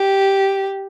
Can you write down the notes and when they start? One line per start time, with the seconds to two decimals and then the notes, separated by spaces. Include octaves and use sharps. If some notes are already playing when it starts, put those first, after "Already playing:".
Already playing: G4